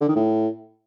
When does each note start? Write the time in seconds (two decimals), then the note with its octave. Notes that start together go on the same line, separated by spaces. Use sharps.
0.01 D3
0.08 D#3
0.15 A2